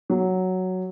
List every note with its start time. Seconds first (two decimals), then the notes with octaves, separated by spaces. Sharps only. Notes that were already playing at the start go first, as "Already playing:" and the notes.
0.10 F#3